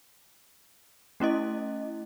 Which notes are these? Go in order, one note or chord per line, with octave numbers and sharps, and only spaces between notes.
A3 C#4 E4 D#5